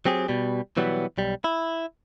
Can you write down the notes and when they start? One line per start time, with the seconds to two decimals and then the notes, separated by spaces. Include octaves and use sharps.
0.06 F#3 C4 G4 G#4
0.29 B2 G3
0.77 B2 E3 F#3 G3 B3
1.18 B1 G3
1.44 E4